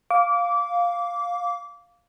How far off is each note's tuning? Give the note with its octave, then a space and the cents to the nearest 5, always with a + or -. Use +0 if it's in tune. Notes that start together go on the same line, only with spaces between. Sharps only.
F5 +5 D6 -25